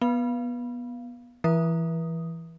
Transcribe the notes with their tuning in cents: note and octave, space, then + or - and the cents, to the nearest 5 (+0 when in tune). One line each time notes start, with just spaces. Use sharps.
B3 -20 F5 -10
E3 +10 B4 -40 D#6 +0